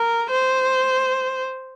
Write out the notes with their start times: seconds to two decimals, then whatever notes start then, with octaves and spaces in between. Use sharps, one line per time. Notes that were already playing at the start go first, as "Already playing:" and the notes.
Already playing: A#4
0.30 C5